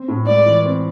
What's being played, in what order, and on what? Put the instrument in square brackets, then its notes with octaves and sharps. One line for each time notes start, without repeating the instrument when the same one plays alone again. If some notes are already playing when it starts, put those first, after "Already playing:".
Already playing: [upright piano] C4
A2
[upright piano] G#3 [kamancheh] D5
[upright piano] E3
C4